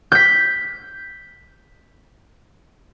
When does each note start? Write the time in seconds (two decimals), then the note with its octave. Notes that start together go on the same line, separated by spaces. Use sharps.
0.12 G6 B6